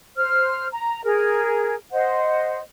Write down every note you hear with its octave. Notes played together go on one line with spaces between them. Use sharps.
C5 F6
A#5
G#4 A#4
C5 D#5 F#5